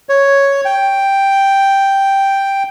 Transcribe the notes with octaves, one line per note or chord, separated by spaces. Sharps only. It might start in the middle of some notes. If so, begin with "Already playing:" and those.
C#5
G5